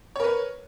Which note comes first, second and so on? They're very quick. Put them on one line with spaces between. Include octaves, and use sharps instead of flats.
C#5 A#4 B4